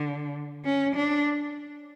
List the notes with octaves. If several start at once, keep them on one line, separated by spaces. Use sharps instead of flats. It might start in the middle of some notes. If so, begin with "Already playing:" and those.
Already playing: D3
C#4
D4